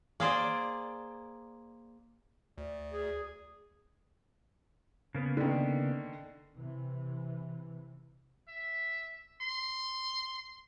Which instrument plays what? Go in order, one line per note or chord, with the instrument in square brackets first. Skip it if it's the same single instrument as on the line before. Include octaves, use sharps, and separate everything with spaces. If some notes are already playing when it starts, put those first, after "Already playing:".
[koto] A#3 G#4 C5 D5
[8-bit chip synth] D2 [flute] D5
[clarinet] G#4
[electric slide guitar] C#3 A#3 B3
[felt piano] D3 D#3
[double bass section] C3 E3
[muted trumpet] E5
C6